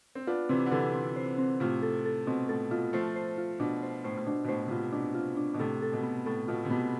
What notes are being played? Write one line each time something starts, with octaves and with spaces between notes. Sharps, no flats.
C4
B3 D4 F4
C3 E3 C4
D3
C3 E3 A4
C4
C5
C4
A2 C3 F4
A4
A4
B2 C4
A2 A4
B2 F4
F3 A3 C5
C5
F4
B2 D4
C5
A2 C5
A2
B2 D4
B2
A2 C5
C3
B2 F4
B2 D4
F4
D4
B2
A2 C3 A4
A4
B2
B3
A2 A4
B2 F4
C3
B2 B3